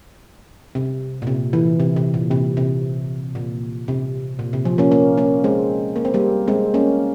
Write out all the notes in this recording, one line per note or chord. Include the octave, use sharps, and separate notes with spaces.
C3
A#2
C3
E3
C3
C3
A#2
C3
C3
A#2
C3
A#2
C3
F3
A#3 C#4
A#3 C#4
A#3 C#4
G#3 C4
A#3
C4
G3 A#3
G#3 C4
A#3 C#4